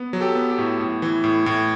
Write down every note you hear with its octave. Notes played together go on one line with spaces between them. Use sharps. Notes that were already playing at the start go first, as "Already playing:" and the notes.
Already playing: B3
F#3
G4 A4
B3
G4
A2
A2
E3
A2
A2